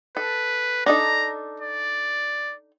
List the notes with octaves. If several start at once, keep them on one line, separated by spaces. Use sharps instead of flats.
A4 B4
D4 D#4 A4 A#5
D5